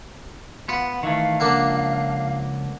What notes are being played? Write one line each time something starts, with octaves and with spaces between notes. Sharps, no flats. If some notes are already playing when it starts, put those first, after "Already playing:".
B3 F4 F#5
D#3 E3 A3 F5
C#2 D3 F3 A#3 D4